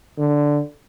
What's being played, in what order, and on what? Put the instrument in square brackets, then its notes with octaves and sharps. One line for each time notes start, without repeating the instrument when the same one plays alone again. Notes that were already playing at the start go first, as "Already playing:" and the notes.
[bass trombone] D3